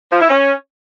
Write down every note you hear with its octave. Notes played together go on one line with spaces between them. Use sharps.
F3
E4
C#4